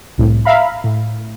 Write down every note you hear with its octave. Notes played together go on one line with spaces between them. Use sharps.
C2 A2
E5 F5 A#5 B5
A2